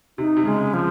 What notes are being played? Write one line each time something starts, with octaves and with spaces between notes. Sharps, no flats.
C3 D#4
C3
C#3 G#3
F3